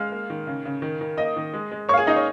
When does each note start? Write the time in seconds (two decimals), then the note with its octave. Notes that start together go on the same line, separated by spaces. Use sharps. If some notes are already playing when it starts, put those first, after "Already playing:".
Already playing: G#3 F5 F6
0.12 A#3
0.30 D#3
0.47 C#3
0.65 C#3
0.82 D#3
1.01 D#3
1.18 A#3 D#5 D#6
1.36 D#3
1.54 G#3
1.72 G#3
1.89 A#3 C#5 C#6
1.94 F5
1.98 G#4 G#5
2.07 A#3 D#4 D#5
2.16 C#5